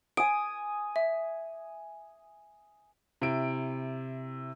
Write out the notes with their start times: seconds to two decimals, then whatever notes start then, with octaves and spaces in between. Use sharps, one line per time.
0.17 G#5 D#6 D7
0.96 E5
3.22 C3 E4 D7